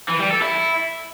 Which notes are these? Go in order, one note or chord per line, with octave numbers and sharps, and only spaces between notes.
E3
G3
A4
E4